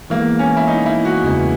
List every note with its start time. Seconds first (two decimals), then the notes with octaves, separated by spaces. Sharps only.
0.10 E3 G#3 A#3 B3
0.39 C#4
0.57 E4
0.68 D#4
0.86 E4
1.05 F#4
1.24 E2 C#3 G#3 B3